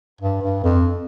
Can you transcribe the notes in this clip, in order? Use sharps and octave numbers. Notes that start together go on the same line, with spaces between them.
G2
G2
F2